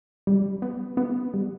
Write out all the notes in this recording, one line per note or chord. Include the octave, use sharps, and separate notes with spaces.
G3
B3
B3
G3